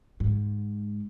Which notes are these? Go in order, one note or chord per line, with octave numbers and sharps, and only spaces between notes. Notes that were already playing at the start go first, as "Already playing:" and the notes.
G#2